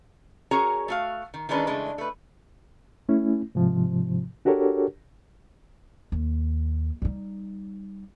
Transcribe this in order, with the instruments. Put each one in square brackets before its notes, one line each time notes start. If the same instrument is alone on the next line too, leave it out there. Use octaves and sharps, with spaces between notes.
[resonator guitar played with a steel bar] C#4 F#4 G#4 A#4 C#5 A#5
A3 F#4 F5
D#3
D#3 E3 G#3 C#4 D4 B4
C#3 E3 G#3 A3 D4
A3 B4
[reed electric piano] A3 C#4 E4
G#2 C3 F3
D4 F#4 G4 A4 A#4 C#5
[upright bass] D#2
G3 D#4